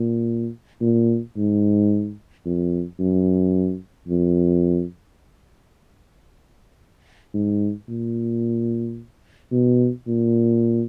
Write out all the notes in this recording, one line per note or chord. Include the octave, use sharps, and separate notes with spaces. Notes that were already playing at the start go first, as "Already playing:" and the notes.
Already playing: A#2
A#2
G#2
F2
F#2
F2
G#2
A#2
B2
A#2